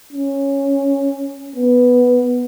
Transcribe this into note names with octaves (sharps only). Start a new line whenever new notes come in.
C#4
B3